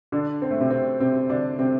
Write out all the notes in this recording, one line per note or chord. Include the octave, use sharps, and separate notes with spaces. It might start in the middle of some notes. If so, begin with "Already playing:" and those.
D3 D4
C4
A3
C3 C4
C3 C4
C3 C4
D3 D4
C3 C4